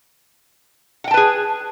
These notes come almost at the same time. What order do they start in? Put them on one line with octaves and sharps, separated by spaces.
F#5 G5 A5 B4 G#4